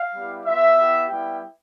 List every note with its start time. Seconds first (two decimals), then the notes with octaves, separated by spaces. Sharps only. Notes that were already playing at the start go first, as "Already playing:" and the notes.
Already playing: F5
0.15 G3 B3 E4 G4
0.46 B3 F4 E5
0.78 B3 E4 G4
1.09 G3 B3 E4 G4 G5